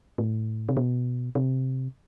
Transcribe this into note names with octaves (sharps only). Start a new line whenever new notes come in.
A2
C3
B2
C3